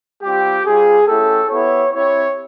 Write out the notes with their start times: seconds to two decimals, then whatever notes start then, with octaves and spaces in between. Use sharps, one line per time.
0.22 G3 C4 F4 G4
0.65 G3 C4 F4 G#4
1.08 A3 C#4 E4 G4 A4
1.50 B3 E4 G4 C#5
1.93 C4 E4 G4 C#5